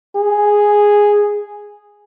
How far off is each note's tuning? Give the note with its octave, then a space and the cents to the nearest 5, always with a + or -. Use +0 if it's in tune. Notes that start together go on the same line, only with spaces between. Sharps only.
G#4 -5